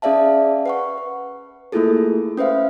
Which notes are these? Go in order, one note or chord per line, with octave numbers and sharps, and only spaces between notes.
C#4 G#4 D5 E5 F5 A5
B4 F#5 C#6
B4
A3 A#3 E4 F4 G#4 A4
C#4 B4 C5 E5 F5